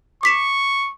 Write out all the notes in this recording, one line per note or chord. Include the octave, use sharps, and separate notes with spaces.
C#6 D6 B6 E7